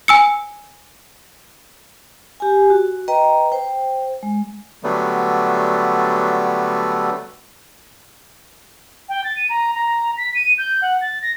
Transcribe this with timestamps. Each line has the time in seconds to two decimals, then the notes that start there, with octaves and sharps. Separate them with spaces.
0.08 G#5 E6 C#7
2.40 G4 G#5
2.70 F#4
3.08 B4 D#5 G5 A#5
3.52 C5 G5
4.23 G#3
4.84 D3 F#3 G3 A3 B3
9.09 G5
9.24 A6
9.36 D#7
9.49 A#5
9.74 A#5
10.17 B6
10.35 D#7
10.58 G6
10.82 F#5
11.01 A6
11.22 A#6